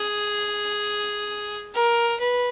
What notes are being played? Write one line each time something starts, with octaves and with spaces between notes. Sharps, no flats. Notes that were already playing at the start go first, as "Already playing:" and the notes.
Already playing: G#4
A#4
B4